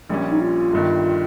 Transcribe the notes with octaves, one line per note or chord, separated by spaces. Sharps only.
A#1 A#2 G3 C#4
D#4
F4
G1 G2 D#3